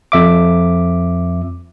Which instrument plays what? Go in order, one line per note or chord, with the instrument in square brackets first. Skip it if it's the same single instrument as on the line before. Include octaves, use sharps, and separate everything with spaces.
[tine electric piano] F2 E5 D6